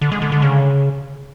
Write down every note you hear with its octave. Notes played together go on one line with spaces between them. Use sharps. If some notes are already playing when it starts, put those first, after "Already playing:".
D3
G#3
D3
D3
C#3